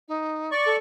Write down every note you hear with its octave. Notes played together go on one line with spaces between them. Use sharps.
D#4
D5 C#6
A4